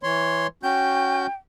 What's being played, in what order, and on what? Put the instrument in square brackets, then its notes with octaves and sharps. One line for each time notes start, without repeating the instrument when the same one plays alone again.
[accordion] E3 C#5 C6
[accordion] C#4 F#4 G6 [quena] G5